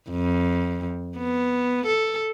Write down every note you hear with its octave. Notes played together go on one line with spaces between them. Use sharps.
F2
B3
A4